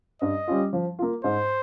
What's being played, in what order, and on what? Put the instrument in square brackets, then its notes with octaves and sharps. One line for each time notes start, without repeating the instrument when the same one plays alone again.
[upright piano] G2 [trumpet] D#5
[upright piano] G3 C#4 F4
F3
A#3 F4
[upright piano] G#2 [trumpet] C5